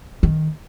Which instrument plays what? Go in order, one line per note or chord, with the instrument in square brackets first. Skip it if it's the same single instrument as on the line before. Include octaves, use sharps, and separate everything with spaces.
[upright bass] D#3